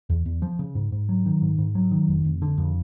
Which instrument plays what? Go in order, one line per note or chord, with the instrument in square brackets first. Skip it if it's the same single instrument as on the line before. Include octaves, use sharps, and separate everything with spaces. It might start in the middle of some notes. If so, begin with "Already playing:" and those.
[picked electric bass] E2
E2
F3
C#3
G#2
G#2
F#3
D#3
G#2
G#2
F#3
D#3
F1
F1
D3
F2